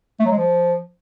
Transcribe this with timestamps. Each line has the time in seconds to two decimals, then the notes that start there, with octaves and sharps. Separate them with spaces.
0.19 A3
0.25 F#3
0.32 G#3
0.38 F3